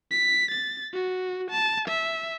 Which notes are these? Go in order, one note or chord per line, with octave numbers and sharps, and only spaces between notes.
B6
A6
F#4
A5
E5